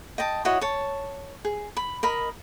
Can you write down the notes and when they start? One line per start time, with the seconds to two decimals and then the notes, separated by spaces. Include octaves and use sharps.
0.18 D#5 G5 A5
0.45 E4 F#4 C#5 D#5
0.61 C#5 A5
1.45 G#4
1.77 B5
2.03 A#4 D#5 B5